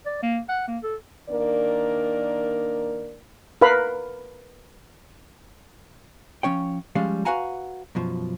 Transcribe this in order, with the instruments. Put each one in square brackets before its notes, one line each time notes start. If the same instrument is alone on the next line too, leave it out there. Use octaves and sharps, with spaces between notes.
[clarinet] D5
A#3
F#5
A#3
A4
[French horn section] D#3 A#3 D4 A#4 D5
[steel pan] A#4 B4 F5 B5
[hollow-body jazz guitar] F3 C#4 C#5 G5
F3 G3 G#3 C#4 D5 F5
F#4 B4 F5 F#5 G#5 A#5
F#2 B2 F3